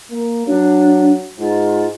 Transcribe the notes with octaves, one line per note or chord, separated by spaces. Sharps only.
A#3
F#3 D4
G#2 F4